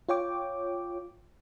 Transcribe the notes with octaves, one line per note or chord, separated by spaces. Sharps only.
F4 C#5 G5 D6